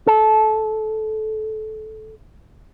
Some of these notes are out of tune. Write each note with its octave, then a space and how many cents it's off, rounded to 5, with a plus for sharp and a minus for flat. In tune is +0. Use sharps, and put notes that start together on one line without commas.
A4 -20